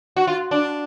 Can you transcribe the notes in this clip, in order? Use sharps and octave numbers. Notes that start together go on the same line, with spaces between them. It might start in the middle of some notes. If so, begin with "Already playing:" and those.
F#4
F4
D4